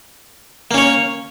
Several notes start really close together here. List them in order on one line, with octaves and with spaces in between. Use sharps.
A#3 C#4 C#5